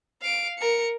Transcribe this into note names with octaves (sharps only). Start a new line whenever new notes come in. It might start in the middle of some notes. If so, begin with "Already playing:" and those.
F5 D7
A#4 C#7